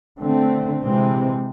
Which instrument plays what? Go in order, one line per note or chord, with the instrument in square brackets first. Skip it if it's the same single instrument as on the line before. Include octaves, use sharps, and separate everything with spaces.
[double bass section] D3 A3 C4
C3 E3 G#3 C4